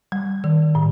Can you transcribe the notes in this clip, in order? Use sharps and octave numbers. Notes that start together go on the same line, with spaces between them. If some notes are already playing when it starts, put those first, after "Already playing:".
G3
D#3
A2